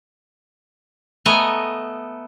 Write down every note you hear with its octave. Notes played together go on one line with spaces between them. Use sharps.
A3 B3 D#5 G#5 A#5